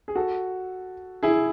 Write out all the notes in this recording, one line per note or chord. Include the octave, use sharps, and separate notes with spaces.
G#4
F#4 A4
E4 G#4